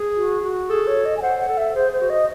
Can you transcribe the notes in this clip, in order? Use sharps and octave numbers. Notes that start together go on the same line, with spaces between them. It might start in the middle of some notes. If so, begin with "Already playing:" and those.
Already playing: G#4
F#4
F#4
G#4 A4
C#5
D#5
G#5
C5 F#5
F#5
A4
E5
G#4 C5
C5
F#4
D#5